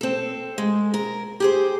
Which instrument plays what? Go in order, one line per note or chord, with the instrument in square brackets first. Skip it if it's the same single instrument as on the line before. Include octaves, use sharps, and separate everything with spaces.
[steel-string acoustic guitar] C4 A4
G#3
A#4
G4 G#4 C5